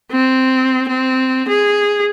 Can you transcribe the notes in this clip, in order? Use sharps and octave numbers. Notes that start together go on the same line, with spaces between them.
C4
C4
G#4